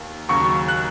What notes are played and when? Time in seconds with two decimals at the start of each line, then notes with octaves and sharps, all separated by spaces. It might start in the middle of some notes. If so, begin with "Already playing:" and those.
Already playing: D#2
0.29 D#2 C#3 F#3 C#6
0.68 F#6